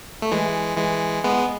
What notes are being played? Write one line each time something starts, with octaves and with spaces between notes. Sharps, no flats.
A3
E3 G#3
E3 G#3
G#3 B3